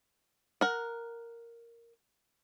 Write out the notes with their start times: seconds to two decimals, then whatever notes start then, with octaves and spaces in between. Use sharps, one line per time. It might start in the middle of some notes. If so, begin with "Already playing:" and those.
0.61 A#4 F#5